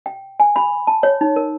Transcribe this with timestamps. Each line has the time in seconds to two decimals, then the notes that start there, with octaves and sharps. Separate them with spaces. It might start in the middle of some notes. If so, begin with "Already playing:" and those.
0.06 G5
0.40 G#5
0.56 B5
0.87 A5
1.03 C#5
1.21 D#4
1.36 A#4